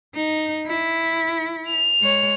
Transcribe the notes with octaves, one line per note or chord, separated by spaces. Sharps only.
D#4
E4
F7
G#3 C#5